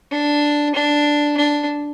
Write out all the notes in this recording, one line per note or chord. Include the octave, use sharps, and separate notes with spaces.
D4
D4
D4